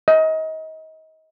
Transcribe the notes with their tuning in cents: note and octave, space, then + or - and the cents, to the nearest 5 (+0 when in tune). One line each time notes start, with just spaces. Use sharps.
D#5 +30